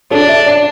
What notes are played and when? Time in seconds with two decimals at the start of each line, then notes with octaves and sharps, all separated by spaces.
0.11 D4 A4
0.21 D5
0.29 E5
0.46 D5